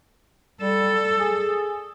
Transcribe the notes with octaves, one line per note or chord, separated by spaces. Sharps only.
G3 A4
G#4